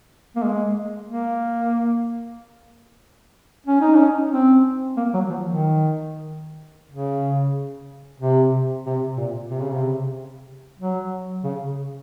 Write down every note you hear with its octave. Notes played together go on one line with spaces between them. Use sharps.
A#3
G#3
A#3
C#4
D#4
C#4
C4
A#3
F#3
F3
D#3
C#3
C3
C3
A#2
C3
C#3
C3
F#3
C#3